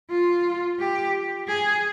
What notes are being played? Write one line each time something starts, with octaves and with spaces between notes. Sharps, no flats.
F4
G4
G#4